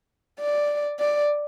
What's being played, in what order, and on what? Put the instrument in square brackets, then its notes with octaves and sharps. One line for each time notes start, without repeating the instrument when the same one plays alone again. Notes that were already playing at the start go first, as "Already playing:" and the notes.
[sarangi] D5
D5